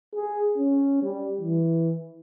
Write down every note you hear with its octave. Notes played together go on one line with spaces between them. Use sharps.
G#4
C#4
G3
E3